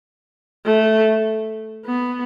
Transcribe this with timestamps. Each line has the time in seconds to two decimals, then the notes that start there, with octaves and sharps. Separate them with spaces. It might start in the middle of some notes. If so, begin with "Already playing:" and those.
0.66 A3
1.86 B3